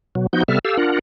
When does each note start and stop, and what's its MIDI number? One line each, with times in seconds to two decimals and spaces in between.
0.15 0.27 47
0.15 0.27 54
0.33 0.43 53
0.33 0.43 59
0.33 0.43 63
0.33 0.43 66
0.33 0.43 91
0.48 0.59 48
0.48 0.59 55
0.48 0.59 59
0.48 0.59 69
0.48 0.59 76
0.48 0.59 89
0.65 0.77 67
0.65 0.77 69
0.65 0.77 77
0.65 0.77 88
0.77 0.99 62
0.77 0.99 65
0.77 0.99 70
0.77 0.99 78